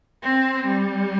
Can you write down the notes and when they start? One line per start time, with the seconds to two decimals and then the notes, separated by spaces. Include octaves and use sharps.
0.23 C4
0.65 G3